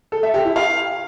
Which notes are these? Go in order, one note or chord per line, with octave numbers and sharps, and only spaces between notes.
A4
E5
G4
E4
F5